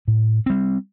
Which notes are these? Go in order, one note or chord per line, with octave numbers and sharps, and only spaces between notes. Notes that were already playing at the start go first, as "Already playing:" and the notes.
A2
G3 C4